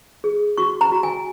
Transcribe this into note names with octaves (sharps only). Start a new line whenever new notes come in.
G#4
F#4 C#6
A#5
F#4
G#5